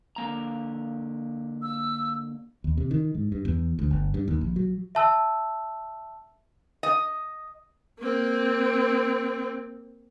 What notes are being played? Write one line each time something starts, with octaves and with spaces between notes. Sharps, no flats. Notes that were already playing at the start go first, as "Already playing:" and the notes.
D3 A#3 A#5
E6
D#2
C3
D#3
G#2
G2
E2
D2
G1
G2
D#2
A#1
F#3
E5 A5 E6
D#5
A#3 C4